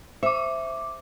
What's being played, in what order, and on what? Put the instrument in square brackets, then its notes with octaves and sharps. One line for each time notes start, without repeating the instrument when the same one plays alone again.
[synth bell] C5 D6 [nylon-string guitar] E5